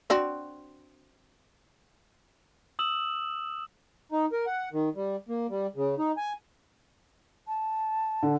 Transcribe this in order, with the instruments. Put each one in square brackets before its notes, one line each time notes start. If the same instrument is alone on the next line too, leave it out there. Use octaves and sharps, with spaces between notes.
[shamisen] C4 D4 F#4
[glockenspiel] D#6 E6 E7 F#7
[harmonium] D#4
A#4
F#5
D#3
G3
A#3
G3
C#3
D#4
G#5
[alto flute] A5
[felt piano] D3